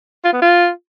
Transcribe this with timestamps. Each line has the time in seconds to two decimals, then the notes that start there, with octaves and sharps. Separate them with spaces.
0.24 F4
0.33 B3
0.42 F4